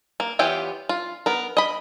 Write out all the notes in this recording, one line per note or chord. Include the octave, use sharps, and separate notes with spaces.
A#3
E3 B3 F4 G4 C#5
F4
B3 A#4
D#5 B5